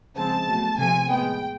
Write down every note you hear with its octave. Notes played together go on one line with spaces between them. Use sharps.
C#3 F3 G#3 C4 A5
B2 F#3 A3
C3 F3 A3 C4 G#5
A2 F3 G#3 B3 G5